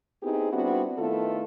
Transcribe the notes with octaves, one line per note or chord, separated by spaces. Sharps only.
B3 C4 D#4 E4 G4 G#4
G3 B3 C4 D4 E4 F#4
D#3 A3 B3 E4 F4 A4